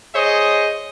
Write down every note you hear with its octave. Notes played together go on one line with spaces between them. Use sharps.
G#4 C5 C#5 D#5